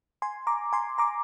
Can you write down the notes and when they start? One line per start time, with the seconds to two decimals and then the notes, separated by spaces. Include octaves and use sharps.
0.22 G#5 C6
0.47 A#5 D6
0.73 G#5 C6
0.98 A#5 D6